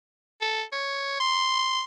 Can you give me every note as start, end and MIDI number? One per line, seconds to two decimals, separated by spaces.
0.42 0.64 69
0.72 1.16 73
1.20 1.84 84